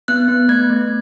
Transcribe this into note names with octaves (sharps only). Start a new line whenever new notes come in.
B3 F#6
B3
A3 G#6
A3